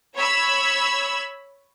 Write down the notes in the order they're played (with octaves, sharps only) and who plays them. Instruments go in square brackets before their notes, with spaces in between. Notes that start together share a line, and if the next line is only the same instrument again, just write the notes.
[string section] C#5 B5 E6